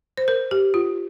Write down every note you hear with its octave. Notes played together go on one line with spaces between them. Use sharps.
C5
A#4
G4
F4